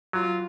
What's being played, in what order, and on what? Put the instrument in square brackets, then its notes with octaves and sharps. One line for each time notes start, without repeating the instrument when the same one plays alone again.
[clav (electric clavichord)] F#3 [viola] F4